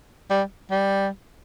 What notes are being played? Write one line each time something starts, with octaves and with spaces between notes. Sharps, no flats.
G3
G3